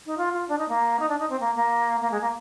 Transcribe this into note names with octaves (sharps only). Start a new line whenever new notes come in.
D#4
F4
F4
D4
D#4
A#3
D#4
D4
D#4
C4
A#3
A#3
A#3
G#3
A#3